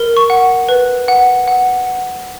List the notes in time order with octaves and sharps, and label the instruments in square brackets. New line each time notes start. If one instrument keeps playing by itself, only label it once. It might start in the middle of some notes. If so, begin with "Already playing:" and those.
Already playing: [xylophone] A#4
C#6
F#5
B4
F#5
F#5
F#5